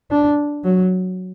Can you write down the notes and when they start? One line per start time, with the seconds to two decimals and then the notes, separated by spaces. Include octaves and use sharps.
0.11 D4
0.64 F#3